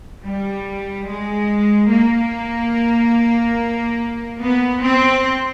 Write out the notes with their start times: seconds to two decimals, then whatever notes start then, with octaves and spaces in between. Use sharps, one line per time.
0.24 G3
1.07 G#3
1.90 A#3
4.41 B3
4.83 C4